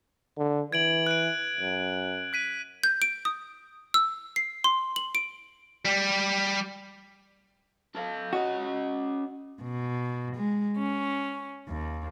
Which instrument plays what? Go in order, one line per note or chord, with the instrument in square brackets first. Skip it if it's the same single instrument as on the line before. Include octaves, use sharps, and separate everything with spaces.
[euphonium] D3
[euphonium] E3 [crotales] G#6 D7 F#7
[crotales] F#6 D7
[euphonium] F#2
[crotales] F#6 B6 D#7
[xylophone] G6
D7
D#6
E6
C7
C6
F#7
D7
[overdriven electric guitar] G3
A4 F5
[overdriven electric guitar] C#4 D#5 [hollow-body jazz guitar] F#4
[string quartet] B2
G#3
C#4
D#2